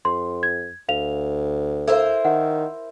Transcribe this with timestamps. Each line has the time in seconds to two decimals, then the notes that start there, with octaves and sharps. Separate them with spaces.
0.05 F2 C6
0.43 G#6
0.89 D2 F5 F7
1.88 E4 A4 A#4 C5
2.25 D#3 F#5